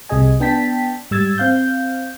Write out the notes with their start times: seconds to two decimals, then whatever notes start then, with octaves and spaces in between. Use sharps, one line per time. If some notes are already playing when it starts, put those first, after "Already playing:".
0.09 C2 C3 G#4 D#5 G#5
0.40 B3 D4 G5 A5 B6
1.11 G#2 G3 E6 G#6 A6
1.38 C4 F5 G6